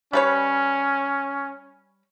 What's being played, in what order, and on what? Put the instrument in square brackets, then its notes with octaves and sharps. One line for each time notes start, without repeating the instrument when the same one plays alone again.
[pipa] G3 B4 C#5 [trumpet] C#4